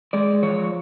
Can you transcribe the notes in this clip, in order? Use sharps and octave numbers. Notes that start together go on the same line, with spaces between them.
G#3 D5
F3 C#5